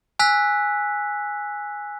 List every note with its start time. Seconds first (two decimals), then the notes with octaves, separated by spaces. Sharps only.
0.19 G#5 E6 F#6 B6